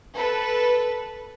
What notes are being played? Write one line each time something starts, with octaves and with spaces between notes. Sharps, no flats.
A4 B4